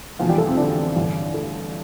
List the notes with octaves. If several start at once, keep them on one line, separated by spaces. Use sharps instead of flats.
F1 E2 B2 F3 F4
G3 G4
A3 A4
C3 C4
D3 D4
A1 G2 D3
A3 A4